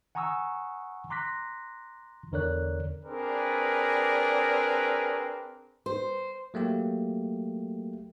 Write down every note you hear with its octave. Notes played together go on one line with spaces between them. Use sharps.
F#5 G#5 A#5 C#6 D#6 E6
A#5 C6 D6 F#6 A#6 B6
E2 D3 A#4 C#5 D5 F#6
C4 D4 G#4 A#4 B4 D5
C5
F#3 A3 A#3 G4